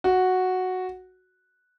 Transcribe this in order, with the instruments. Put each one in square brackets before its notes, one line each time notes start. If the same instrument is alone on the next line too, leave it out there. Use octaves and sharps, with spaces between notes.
[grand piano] F#4